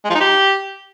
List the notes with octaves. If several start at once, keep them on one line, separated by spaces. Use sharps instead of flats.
G#3
F3
D#4
G4